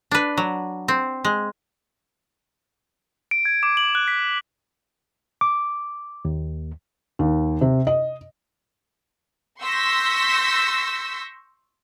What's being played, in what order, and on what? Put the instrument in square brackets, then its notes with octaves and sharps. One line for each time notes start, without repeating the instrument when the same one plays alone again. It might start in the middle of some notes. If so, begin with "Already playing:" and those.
[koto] D4 B4
F#3
C4
G#3
[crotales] D7
G#6
D6
F#7
F#6
B6
[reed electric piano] D6
D#2
[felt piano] D#2
C3
D#5
[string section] C6 C#6 E6 G6 A#6 B6